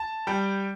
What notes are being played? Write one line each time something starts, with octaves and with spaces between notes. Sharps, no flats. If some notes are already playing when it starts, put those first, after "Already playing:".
Already playing: A5
G3 G5